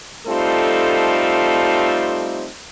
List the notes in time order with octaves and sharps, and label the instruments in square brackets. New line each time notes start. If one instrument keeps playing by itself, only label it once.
[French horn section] G3 A3 C4 D#4 F4 A4